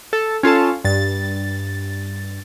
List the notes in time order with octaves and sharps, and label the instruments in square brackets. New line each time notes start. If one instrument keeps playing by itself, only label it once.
[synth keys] A4
C#4 F4 A4 A5
G2 A6